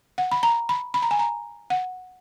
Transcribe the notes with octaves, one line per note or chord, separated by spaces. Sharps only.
F#5
B5
A#5
B5
B5
A#5
G#5
A#5
F#5